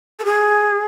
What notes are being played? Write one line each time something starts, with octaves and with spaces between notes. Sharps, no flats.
A4
G#4